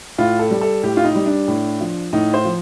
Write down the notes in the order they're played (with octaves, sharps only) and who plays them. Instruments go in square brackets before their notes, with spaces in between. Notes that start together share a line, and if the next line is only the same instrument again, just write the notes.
[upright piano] A2 F4
A4
G3
A4
A2 G4
F4
D#4
G3
D4
A2
F3
A2 D#4
C5
F3